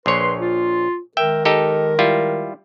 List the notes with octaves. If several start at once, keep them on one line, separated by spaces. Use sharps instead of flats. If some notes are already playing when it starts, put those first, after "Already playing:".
A#1 B4 C#5 C6
F4
D#3 G#3 A#4 E5 G5
D#4 G4 A4
G3 E4 F4